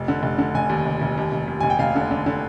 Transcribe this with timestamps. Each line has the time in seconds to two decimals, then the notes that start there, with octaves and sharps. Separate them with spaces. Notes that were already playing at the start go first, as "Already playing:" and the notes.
Already playing: F1
0.08 D3
0.23 F1
0.38 D3
0.55 F1 G#5
0.69 D#2
0.86 F1
1.01 F1
1.17 D#2
1.32 F1
1.48 D#2
1.61 F1 G#5
1.70 G5
1.79 F1 F5
1.95 D3
2.11 D3
2.26 D3